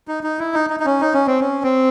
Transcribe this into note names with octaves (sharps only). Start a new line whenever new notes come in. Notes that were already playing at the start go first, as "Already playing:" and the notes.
D#4
D#4
E4
D#4
D#4
D#4
C#4
D#4
C#4
C4
C#4
C4